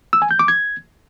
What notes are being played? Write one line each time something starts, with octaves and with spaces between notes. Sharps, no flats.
E6
G#5
G6
D6
G#6